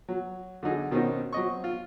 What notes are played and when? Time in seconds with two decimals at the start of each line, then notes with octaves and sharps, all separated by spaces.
0.09 F#3
0.63 D3 F#3 D#4 G#4
0.91 B2 D#3 C4 C#4 D#4
1.32 F#3 C4 D#5 C#6
1.64 F4